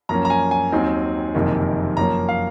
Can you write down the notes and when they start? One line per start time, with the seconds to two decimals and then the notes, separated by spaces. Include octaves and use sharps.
0.09 F#2 F3 A#3 C#4 A#5
0.25 A#5
0.30 G#5
0.51 G#5
0.72 D#2 D#3 F#3 C4 D#4
1.34 F#1 F2 C3 D#3 A#3
1.97 F#2 F3 A#3 C#4 A#5
2.29 F5